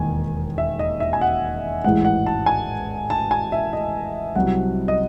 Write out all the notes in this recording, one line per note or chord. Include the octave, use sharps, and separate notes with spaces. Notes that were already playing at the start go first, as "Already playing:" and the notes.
Already playing: E1 D#2 D#3 G#5
E5
D#5
E5
G#5
F#5
A1 G#2 E3 G#3 F#5
F#5
A5
G#5
A5
G#5
E5
D#5
C2 C3 F#3 F#5
D#5